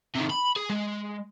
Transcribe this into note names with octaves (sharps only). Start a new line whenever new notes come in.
C3 D#3
B5
G#4
G#3